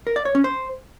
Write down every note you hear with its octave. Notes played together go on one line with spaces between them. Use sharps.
A#4
D5
C#5
C#4
C5